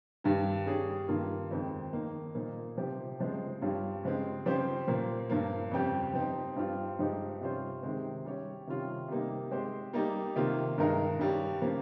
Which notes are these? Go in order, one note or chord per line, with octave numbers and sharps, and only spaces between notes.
G2 D#3 G3
G3 C#4 G#4
G2 D#3 A#3 F4
F2 D#3 G#3 C4
D#3 A#3 D#4
A#2 F3 A#3 D#4
C3 F3 C4 G4
C#3 F3 G#3 C4
G2 G3 C#4 F4
C#3 F3 G#3 C4
C#3 F3 C4 G4 C5
A#2 F3 A#3
G2 F3 A#3
F2 C#3 G3 C4 G4
F3 C4 D#4
G2 G3 C4 F4
G2 F3 G#3 D#4 G4
C3 G3 C#4 F4 C5
C3 D#3 G#3 C4
G3 C#4 G4 C#5
C3 D#3 G3 C#4 F4
C3 G3 A#3 D#4
G#3 C4 G4 C5
G3 A#3 D#4
C3 D#3 A#3 F4
G2 D#3 G#3 D#4 A#4
G2 G3 C#4
C#3 F3 A#3